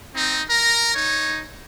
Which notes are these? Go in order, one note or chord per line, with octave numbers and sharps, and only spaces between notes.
C4 D#4
A#4 A#5
D#4 C#5